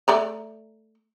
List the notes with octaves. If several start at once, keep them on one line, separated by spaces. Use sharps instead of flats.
A3 D5 A#5